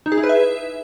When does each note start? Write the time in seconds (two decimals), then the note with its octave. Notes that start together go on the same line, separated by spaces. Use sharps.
0.06 D#4
0.12 G#4
0.18 E4
0.23 B4
0.29 E5